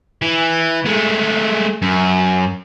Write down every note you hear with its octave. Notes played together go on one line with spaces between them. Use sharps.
E3
G#3 A3
F#2